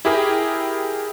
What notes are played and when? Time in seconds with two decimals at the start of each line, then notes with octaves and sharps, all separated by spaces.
0.05 E4 G4 G#4 A#4 G5